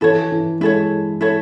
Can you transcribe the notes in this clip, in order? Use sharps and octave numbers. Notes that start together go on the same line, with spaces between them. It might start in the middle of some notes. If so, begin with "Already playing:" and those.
E3 E4 A4 C#5
E3
G#3 E4 A4 C#5
E4 A4 C#5